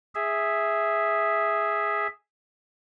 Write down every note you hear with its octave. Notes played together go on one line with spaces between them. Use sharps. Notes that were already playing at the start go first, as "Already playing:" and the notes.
G#4 E5